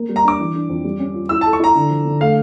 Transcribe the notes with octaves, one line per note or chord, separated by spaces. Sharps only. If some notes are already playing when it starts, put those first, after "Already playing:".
Already playing: A#3
G3
A#5
D4 D6
E3
D4
F2
G3
C#4
F4
E4 E6
A4 A5
C#6
E4 A#5
D3
F3
D3
A3 F5